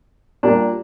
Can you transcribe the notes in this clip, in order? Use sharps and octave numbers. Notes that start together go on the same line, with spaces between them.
A#2 G3 A#3 D4